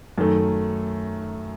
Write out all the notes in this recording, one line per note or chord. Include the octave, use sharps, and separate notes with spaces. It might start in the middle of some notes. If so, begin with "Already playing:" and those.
F#2 D#3 A3